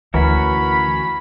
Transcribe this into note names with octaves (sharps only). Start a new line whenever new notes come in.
D2 E3 C#4 F#4 A#4 B5